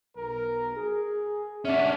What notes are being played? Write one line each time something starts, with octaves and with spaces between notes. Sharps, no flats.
B1 A#4
G#4
F#1 C2 C#4 D4 E5 F#5